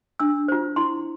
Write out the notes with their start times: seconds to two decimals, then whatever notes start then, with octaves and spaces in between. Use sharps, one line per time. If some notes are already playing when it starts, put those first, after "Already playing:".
0.20 D4 E6
0.48 F4 C5
0.76 E4 C6